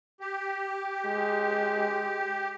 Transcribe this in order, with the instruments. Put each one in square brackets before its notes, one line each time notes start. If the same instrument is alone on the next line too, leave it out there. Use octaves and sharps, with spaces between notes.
[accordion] G4
[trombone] G#3